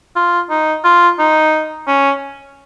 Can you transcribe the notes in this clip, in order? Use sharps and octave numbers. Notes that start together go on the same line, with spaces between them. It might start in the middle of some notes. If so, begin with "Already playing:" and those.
F4
D#4
F4
D#4
C#4